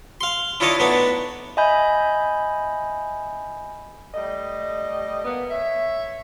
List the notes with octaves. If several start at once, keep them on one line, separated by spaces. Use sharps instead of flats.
F5 C6
D4 E4 F4 C#5 D#5 A5
A2 B3 D4 D#4
D#5 E5 G#5 B5 G6
G3 A3 D#5
A#3 B3
C#5 E5